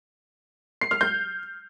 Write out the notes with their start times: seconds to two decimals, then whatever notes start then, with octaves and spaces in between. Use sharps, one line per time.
0.81 C7
0.91 F6
1.01 G6